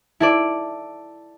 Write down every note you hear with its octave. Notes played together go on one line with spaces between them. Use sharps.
E4 A4 D5